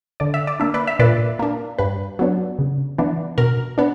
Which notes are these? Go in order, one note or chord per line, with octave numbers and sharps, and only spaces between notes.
D3 D5
E5
D5
A#3 D4 E5
B4 D5
E5
A#2 B4 D5
A#3 D4
G2 B4
F#3 B3 D4
C#3
E3 B3 D4
B2 A#4
B3 D4